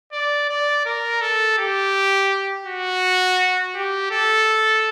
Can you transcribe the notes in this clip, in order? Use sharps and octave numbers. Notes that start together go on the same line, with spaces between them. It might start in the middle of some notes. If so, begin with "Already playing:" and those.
D5
D5
A#4
A4
G4
F#4
G4
A4